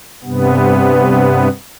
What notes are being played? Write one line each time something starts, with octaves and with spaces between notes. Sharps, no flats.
G2 C3 B3